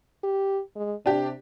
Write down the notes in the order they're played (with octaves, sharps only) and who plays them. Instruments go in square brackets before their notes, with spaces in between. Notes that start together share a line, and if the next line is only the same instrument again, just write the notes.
[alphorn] G4
G#3
[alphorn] C3 [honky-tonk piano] D4 G4